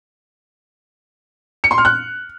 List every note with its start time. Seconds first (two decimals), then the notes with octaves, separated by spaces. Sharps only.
1.64 C#7
1.71 C6
1.78 F6
1.85 F#6